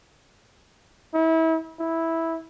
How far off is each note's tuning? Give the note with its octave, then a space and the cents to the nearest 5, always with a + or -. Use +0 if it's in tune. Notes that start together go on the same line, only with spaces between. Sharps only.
E4 -30
E4 -5